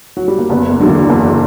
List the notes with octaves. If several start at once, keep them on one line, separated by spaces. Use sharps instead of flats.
F#3
G3
A#3
F#1 B3
A#3
E2 D3 F#3
A#3
F#1 A#3